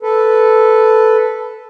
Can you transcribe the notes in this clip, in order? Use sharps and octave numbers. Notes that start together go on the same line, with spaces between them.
A4 B4